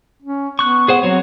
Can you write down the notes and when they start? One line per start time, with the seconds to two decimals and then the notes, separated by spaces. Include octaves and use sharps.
0.22 C#4
0.59 B3 C#6 F#6
0.88 G#4 C5 F#5
1.03 F#3 C4 F#4 C#5